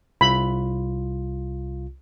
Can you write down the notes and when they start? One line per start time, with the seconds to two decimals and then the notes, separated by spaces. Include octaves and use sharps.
0.21 C2 F4 B5